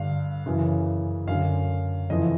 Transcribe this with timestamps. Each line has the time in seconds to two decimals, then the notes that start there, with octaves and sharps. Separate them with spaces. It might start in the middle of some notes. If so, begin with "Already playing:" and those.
Already playing: G2 D3 F5
0.46 F#2 C#3 E3
1.27 F#2 D3 F5
2.10 F2 C#3 E3 D#5